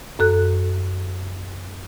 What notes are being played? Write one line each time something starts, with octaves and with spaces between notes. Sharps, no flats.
F#2 A4 F#6